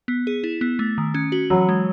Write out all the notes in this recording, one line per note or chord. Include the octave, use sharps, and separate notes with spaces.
B3
G#4
E4
B3
A3
D#3
C#4
F#4
E3 F#3
G#3